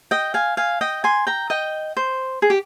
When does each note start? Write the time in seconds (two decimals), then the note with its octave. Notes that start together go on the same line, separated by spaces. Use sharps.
0.11 D#5 G5
0.34 F5 G#5
0.57 F5 G#5
0.81 D#5 G5
1.04 G#5 C6
1.27 G5 A#5
1.50 D#5 G5
1.97 C5
2.42 G#4
2.50 G4